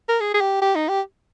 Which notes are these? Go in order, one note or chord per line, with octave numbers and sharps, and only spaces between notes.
A#4
G#4
G#4
G4
G4
D#4
G4